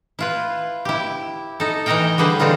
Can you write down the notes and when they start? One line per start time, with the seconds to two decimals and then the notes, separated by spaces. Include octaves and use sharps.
0.19 E4 F4 B4
0.85 E4 G4
1.60 D#4 A4
1.86 E3 D#4 E4 D#5 F5 G5
2.18 D3 G3 G#4 B4 C5
2.40 D3 E3 C4 D#4 F4